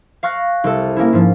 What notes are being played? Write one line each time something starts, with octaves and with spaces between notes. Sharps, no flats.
F5 C#6 F6 F#6 A#6
C2 A4
A#3 C#4 E4
G#2 F3